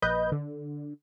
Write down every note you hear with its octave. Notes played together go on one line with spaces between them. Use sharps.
A#1 B4 D#5 G6
D3